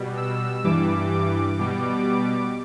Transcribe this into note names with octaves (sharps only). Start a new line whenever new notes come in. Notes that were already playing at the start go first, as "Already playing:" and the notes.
Already playing: B2 G3
E6
G2 E3 G3 D6
D6
B2 G3